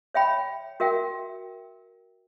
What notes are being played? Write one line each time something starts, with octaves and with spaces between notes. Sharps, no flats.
C#5 E5 G5 B5
F#4 A#4 E5 G5